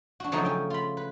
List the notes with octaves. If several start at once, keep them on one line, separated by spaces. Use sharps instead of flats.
D4 F#4
C#3 F3 F#3 A3 D#4
C#4 G5
F4 B5
B4